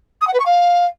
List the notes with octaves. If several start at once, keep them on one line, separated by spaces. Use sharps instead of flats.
D#6
F#5
B4
C#6
F5